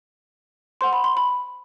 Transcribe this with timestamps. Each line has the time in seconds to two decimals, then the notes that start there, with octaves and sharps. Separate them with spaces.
0.81 C5 F#5 C6
0.93 B5
1.04 C6
1.17 B5